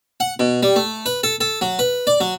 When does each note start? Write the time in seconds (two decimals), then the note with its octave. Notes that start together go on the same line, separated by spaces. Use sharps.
0.20 F#5
0.39 B2
0.63 G3
0.76 A3
1.06 B4
1.23 A4
1.41 A4
1.61 F#3
1.79 B4
2.07 D5
2.20 F#3